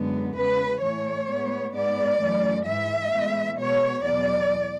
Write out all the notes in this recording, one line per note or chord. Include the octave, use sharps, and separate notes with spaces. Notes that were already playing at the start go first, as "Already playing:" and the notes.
Already playing: F#2 D3 G#3 B3
E2 C#3 G#3 B4
A2 E3 A3 C#5
A2 G#3 B3
G#2 G#3 B3 D5
F#2 E3 A3
G#2 E3 G#3 E5
A2 E3 G#3 B3
B2 G#3 B3 C#5
E2 B2 F#3 D5